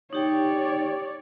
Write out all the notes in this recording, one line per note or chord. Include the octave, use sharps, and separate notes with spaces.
D#4 G4 C#5 D5 G5